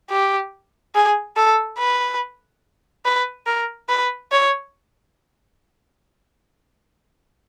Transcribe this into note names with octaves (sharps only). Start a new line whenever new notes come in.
G4
G#4
A4
B4
B4
A#4
B4
C#5